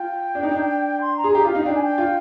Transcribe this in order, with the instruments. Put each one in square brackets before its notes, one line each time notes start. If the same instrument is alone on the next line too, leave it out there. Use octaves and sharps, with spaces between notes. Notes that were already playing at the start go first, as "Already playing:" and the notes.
Already playing: [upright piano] F4 [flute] G5
[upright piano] D4
D#4
D4
[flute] C6
A#5
[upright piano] G#4
G4
[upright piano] F4 [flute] F5
[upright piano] D#4
[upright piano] D4 [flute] G5
[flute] G#5
G5
[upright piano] F4